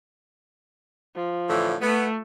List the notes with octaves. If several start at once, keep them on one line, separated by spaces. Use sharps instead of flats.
F3
A2 D3 E3
A3 B3